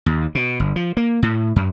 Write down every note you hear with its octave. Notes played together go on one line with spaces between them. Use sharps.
D#2
B2
G1
F3
A#3
A2
F#2